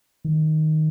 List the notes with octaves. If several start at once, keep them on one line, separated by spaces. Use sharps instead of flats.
D#3